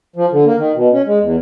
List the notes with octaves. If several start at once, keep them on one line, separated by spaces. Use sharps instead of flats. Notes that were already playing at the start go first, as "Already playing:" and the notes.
F3
D3
A#3
D#3
B2
C#4
G#3
E2